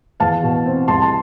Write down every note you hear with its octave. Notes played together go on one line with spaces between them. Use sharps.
E2 F5 A5
B2
C4
C2 A5 C6
A5